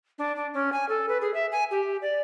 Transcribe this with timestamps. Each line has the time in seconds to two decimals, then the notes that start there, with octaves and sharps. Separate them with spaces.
0.18 D4
0.36 D4
0.53 C#4
0.72 G#5
0.88 A4
1.08 B4
1.21 G#4
1.34 E5
1.51 G#5
1.71 G4
2.02 D5